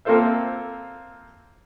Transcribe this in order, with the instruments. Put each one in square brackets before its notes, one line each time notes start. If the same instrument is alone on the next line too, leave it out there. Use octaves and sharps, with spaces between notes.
[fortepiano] A#3 C4 F4 A4 C5 E5